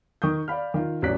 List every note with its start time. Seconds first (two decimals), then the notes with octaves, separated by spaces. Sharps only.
0.22 D#3 C#6 D#6 G6
0.48 D5 F5 B5 F6
0.74 D#3 F4
1.02 A1 F#3 C#4 D5 F#6 B6